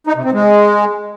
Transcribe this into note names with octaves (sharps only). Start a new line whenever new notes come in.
D#4
C3
C4
G#3